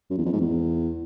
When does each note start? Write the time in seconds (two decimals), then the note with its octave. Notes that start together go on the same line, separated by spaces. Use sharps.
0.10 F#2
0.18 E2
0.25 F2
0.33 G#2
0.40 E2